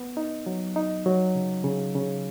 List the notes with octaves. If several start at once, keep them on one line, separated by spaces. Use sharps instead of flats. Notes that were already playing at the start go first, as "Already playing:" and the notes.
Already playing: B3
D#4
F#3
D#4
F#3
C#3
C#3
C#3